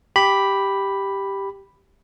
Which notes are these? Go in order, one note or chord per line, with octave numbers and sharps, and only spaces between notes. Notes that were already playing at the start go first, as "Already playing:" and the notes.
G4 B5